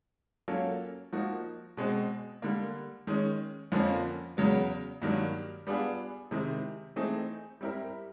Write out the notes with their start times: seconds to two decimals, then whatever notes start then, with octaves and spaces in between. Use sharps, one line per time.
0.48 F#3 A#3 C#4 F4 A4
1.13 F3 A#3 D#4 F#4
1.77 B2 G#3 C4
2.42 D3 G3 A#3
3.07 D#3 G#3 C#4
3.72 F2 D3 F3 A#3 C#4
4.37 E2 C#3 F#3 B3
5.02 G2 D#3 F#3 A#3 D4
5.67 G3 B3 D4 F4 G#4
6.31 C3 D#3 G#3 C4 E4
6.96 E3 A3 C4 D#4 G#4
7.61 G3 C4 E4 G4 A#4